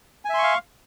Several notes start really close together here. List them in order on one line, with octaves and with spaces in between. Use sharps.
G#5 E5 C6 C#6 F5